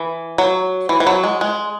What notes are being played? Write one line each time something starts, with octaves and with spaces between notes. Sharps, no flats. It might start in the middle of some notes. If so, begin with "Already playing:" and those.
Already playing: E3
F#3
E3
E3
F#3
G#3
G#3